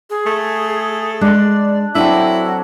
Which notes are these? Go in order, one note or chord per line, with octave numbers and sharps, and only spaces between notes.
G#4
A3
G#3 D4 D5
F#3 C4 D4 E4 A4